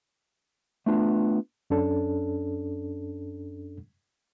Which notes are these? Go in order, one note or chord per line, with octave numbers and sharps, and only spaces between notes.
A3 B3 D4 F4
F#2 C#4 D4 A4